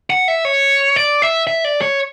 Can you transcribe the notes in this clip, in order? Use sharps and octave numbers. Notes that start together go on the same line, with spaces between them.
F#5
E5
C#5
D5
E5
E5
D5
C#5